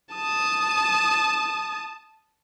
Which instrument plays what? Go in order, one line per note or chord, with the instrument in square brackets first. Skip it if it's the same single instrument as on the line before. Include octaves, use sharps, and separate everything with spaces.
[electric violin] A5 D#6